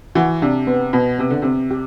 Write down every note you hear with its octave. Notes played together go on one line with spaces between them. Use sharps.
E3 F#4
C3 D4
B3
B2 B3
C3 B3
D3
C3 C4
G4